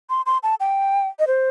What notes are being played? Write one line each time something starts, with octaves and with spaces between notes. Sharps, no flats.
C6
C6
A5
G5
D#5
C5